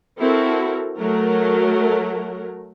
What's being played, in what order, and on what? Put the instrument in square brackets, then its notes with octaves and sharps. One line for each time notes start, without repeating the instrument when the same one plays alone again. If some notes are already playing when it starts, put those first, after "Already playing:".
[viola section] C4 E4 F#4 A4 A#4
F#3 A3 A#4